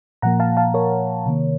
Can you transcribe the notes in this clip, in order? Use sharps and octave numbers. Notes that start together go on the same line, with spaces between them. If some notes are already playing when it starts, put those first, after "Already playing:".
A#2 F3 A#3 F#5 A#5
F5 A5
F5 A5
A#4 C#5
C3 D#3 A#3